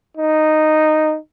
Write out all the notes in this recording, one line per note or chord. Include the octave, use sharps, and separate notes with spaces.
D#4